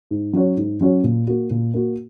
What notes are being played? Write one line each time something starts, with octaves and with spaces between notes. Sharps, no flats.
G#2
F#3 C#4 F#4 C#5
G#2
F#3 C#4 F#4 C#5
A#2
A#3 F#4
A#2
A#3 F#4